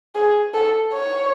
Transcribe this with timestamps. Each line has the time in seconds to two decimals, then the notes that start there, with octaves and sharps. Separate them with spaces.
0.15 G#4
0.54 A4
0.94 C#5